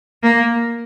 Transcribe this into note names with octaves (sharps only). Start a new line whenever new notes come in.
A#3